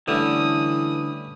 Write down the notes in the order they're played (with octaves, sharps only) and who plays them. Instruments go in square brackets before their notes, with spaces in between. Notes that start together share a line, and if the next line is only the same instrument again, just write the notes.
[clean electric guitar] D3 [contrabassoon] E3 [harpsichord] G3 A3 C#4 [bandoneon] D#6